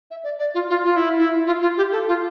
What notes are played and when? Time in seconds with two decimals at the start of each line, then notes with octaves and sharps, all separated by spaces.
0.11 E5
0.24 D5
0.39 D5
0.54 F4
0.70 F4
0.85 F4
0.96 E4
1.19 E4
1.47 F4
1.62 F4
1.77 G4
1.92 A4
2.08 F4